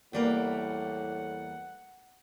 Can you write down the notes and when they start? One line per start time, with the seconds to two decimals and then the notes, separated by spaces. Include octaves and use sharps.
0.13 E2 A2 G3 A#3 F#5